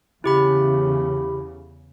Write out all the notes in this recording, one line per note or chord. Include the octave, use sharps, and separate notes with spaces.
E2 C#3 E4 G4 B5